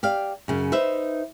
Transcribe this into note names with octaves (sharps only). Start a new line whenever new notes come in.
G4 D5 F5
F#2 C#3
D#4 B4 C5 E5